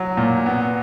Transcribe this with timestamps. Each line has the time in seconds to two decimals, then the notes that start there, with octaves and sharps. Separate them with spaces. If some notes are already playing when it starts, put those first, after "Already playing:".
Already playing: F#3
0.17 A#2
0.46 B3